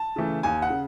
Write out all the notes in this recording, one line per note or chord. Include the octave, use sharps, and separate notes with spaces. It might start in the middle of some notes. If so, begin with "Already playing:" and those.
Already playing: A5
C#3 E3 A3
D#2 G#5
F#5
C#3